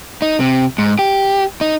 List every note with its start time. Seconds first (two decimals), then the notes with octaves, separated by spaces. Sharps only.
0.22 D#4
0.40 C3
0.78 G#2
0.99 G4
1.61 D#4